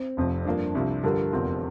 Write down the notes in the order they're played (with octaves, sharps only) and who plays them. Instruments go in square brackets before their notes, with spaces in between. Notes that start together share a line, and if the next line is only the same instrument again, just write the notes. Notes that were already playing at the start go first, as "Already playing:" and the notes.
Already playing: [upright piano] C4
[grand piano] F1 F2 C3 F3
[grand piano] G2 F3 A#3 [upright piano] D4
[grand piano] C2 C3 F3
[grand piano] G2 D3 F3 [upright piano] G4 A#4
[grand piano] F1 E2 C3 F3 C4